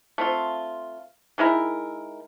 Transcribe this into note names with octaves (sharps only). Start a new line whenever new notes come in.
A3 C4 F4
D#3 G#3 E4 A#4